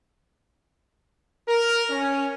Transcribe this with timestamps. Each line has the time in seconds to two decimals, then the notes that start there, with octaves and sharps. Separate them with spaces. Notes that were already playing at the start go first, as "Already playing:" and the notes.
1.48 A#4
1.90 C#4